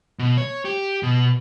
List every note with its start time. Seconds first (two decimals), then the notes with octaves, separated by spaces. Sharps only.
0.19 B2
0.38 C#5
0.65 G4
1.03 B2